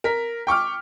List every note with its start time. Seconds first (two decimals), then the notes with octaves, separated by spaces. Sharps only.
0.04 A#4 B6
0.47 G5 C#6 D6 F6